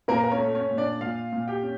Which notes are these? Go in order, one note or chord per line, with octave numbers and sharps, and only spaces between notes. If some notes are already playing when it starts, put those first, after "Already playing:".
A#2 A#3 A#4
A#4
C#4 C#5
A3
C#4 C#5
A#2
D4 D5
A#2 F4 F5
A#2
G4 G5
C#4